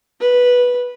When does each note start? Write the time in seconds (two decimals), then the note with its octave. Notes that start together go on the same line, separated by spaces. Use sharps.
0.20 B4